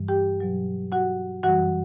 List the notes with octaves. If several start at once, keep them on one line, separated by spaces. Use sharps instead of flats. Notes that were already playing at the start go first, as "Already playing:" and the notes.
Already playing: G2 E3 G3
G4 G5
B2 F#3
F#4 F#5
F#2 E3 G3 F#4 F#5